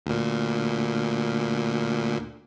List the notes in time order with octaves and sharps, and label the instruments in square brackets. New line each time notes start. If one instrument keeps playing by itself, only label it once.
[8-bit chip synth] D2 A#2